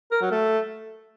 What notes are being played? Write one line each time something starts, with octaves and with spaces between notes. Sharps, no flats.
A#4
F#3
A3